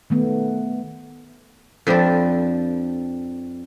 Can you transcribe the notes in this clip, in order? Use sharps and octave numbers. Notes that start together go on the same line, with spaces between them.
D#3 A3 B3
F2 F3 D4 B4 D5